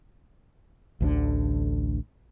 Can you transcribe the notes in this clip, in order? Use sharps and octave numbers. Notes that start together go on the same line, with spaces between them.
A1 D2 D3